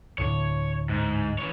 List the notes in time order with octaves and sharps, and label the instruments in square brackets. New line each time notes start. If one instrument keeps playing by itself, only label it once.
[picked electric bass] D2 A2 D3 [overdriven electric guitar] C#5
[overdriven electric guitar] G#2
E3 C#5